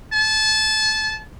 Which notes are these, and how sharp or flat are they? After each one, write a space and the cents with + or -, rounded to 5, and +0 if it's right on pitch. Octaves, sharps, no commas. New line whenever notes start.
A5 -25